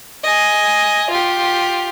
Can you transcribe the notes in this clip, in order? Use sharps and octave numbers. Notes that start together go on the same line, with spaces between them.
D#5 G#5
F4 G4